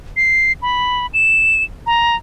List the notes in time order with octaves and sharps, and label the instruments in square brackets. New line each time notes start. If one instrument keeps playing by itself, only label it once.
[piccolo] C7
B5
E7
A#5